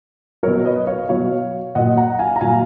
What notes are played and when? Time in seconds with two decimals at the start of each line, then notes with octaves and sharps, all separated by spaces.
0.43 B2 F#3 A#4 C#5
0.65 B4 D#5
0.87 C#5 F5
1.09 B2 F#3 C#5 F5
1.75 A#2 F#3 D#5 F#5
1.97 F#5 A#5
2.19 F5 G#5
2.36 A#5
2.41 A#2 F#3 F5 G#5